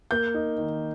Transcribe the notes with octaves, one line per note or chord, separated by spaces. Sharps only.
A#3 G6
D#4
D#3